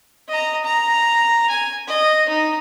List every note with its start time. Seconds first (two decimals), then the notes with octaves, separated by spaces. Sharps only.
0.29 D#5 A#5
0.64 A#5
1.50 G#5
1.87 D#5
2.29 D#4